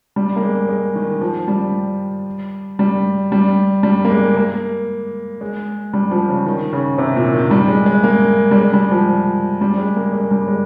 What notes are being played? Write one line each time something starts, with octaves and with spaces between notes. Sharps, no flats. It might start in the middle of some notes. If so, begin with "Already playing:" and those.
G3
A#3
G#3
G#3
D#3
F3
G3
G3
G3
G3
A#3
G#3
A#3
G#3
G3
F3
C#3
D#3
C#3
C3
A#2
D#3
G3
G#3
G#3
A#3
G3
G#3
G3
F3
G3
G#3
A#3
G#3
G3
G#3